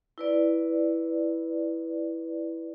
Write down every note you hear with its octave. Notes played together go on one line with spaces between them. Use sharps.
E4 B4 D5